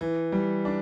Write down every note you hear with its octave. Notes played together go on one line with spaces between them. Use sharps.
E3
G3
D4